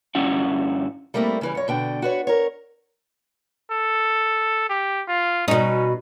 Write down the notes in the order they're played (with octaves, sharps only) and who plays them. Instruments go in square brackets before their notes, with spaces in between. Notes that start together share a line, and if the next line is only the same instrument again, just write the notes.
[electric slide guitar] G2 C#4 E4 F#5
[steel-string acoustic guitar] G3 A3 A#3 C4 E4
C#3 E3 G3
F#2 C#5
B2 D3 G5
F#4 B4 C#5
A#4 C#5
[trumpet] A4
G4
F4
[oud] B2 D#4 [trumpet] C#4